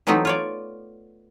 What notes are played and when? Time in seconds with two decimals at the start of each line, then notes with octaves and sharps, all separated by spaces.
0.07 E3 F#3 A3 B3 C4 D#4
0.25 F4 C#5 D5